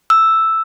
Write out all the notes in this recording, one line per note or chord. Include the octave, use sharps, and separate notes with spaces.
E6